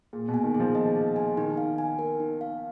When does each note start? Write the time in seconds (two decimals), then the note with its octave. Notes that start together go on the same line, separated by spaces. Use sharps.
0.13 A#2 G#4
0.28 B2
0.34 G#5
0.44 D#3
0.55 G#4
0.60 F3
0.75 D#5
0.96 G#4
1.16 G#5
1.37 D#3 D#4
1.57 F5
1.78 G#5
1.99 A#4
2.20 D#4
2.41 F5